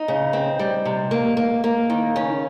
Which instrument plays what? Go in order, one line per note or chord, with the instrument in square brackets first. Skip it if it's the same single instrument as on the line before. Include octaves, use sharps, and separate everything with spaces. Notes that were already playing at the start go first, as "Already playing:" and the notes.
Already playing: [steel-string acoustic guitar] D#4
C#3
C4
G3
C3
A#3
A#3
A#3
D#3
C#3 C#4